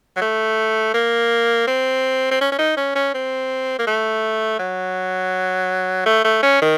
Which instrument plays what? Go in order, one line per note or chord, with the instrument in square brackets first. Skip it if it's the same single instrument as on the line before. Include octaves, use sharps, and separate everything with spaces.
[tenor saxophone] F#3
A3
A#3
C4
C4
C#4
C#4
D#4
C#4
C#4
C4
A#3
A3
F#3
A3
A3
C#4
D#3